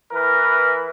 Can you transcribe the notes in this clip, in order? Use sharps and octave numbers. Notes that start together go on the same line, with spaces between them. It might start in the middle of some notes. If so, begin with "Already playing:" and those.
E3 A#4 B4